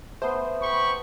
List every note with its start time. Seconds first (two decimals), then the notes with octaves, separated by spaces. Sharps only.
0.22 A3 B3 C5
0.62 G4 B5 C#6